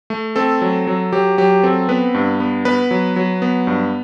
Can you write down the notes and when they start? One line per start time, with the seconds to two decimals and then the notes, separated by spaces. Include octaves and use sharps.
0.10 A3
0.36 C4 A4
0.61 F#3
0.87 F#3
1.12 F#3 G4
1.38 F#3 G4
1.63 C4 A4
1.89 B3 B4
2.14 G2
2.40 B3
2.65 B3 B4
2.91 F#3
3.16 F#3
3.42 B3
3.67 G2